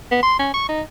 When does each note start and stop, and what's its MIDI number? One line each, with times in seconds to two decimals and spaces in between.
0.11 0.21 59
0.23 0.37 84
0.39 0.52 61
0.54 0.64 85
0.69 0.82 63